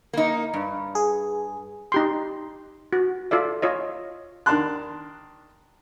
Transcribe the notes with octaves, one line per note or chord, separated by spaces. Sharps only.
A#3 D#4
G2
G#4
D#4 G4 C6
F#4
F4 A4 D5 E5
F4 C#5 D#5
D#3 D4 A#4 A5 C6 F#6